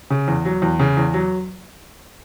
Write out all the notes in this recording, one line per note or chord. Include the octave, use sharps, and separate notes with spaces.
C#3
E2
F#3
E2
C#3
E2
F#3